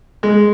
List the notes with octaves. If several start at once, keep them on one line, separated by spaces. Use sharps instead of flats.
G#3